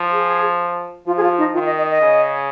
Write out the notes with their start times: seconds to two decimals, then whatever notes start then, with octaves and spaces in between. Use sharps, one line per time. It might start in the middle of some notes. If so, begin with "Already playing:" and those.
Already playing: F3
0.12 G#4
1.07 F3 F4
1.17 G#4
1.23 F4
1.38 D#4
1.54 D#3 F4
1.66 D#5
1.78 D#5
1.90 D#5
2.01 C#3